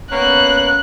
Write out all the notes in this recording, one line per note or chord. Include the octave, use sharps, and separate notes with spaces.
A#3 B3 C#4 F#6